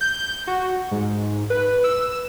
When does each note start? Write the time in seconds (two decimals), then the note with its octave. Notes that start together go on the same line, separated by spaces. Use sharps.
0.01 G6
0.47 F#4
0.91 G#2
1.50 B4
1.84 E6